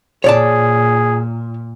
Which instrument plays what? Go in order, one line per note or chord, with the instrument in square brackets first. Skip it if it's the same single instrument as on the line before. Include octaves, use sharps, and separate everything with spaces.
[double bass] A#2 [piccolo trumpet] G#4 [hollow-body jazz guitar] C#5 D5 A5